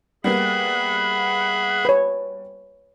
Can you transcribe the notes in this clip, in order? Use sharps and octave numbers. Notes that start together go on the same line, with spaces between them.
G3 A#3 B3 G#4 E5 F#5 B5
B4 C#5